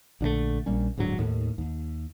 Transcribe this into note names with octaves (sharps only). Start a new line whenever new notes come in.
A#1 D3 G#3 A3
A#1 G3 A#3 C#4
D1 G#2 D3 F#3
D#2 A2 D#3
D#2